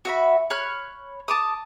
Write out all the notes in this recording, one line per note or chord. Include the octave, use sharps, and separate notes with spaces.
F#4 E5 B5
C#5 B5 F6 F#6
A5 D6 D#6